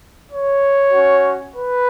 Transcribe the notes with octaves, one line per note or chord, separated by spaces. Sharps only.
C#5
C#4 F#4
B4